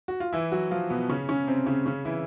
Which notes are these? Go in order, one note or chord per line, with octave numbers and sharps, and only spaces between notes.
F#4
F4
E3 E4
F#3 F#4
F3 F4
B2 B3
C#3 C#4
C#3 C#4
C3 C4
C#3 C#4
C#3 C#4
E3 E4